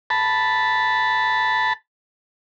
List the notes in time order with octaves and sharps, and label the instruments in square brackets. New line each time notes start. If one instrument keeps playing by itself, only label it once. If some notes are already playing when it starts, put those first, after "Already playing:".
[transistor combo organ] A5 B5